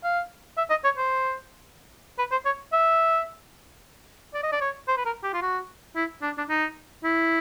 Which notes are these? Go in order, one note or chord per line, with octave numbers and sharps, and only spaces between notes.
F5
E5
D#5
C#5
C5
B4
C5
C#5
E5
D5
D#5
D5
C#5
C5
B4
A#4
G4
F4
F#4
E4
D4
D4
D#4
E4